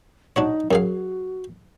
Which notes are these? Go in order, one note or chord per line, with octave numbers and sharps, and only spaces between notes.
D4 D#4 F#4 C#5
F#2 F#4 G#4 F5